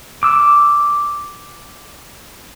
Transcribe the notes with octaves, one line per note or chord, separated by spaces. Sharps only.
D6 E6